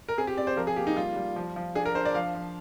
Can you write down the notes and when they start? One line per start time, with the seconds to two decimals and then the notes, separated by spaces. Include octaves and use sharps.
0.09 A#4
0.18 C4 G#4
0.27 G4
0.37 C4 D5
0.47 C5
0.57 F3 A#4
0.67 G#4
0.76 A#3 G4
0.87 D#4
0.97 G3 F4
1.16 G3
1.36 F3
1.56 F3
1.75 D4 G#4
1.85 A#4
1.95 D4 C5
2.05 D5
2.15 F3 F5
2.35 F3